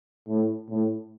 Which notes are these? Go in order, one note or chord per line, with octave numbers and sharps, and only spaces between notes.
A2
A2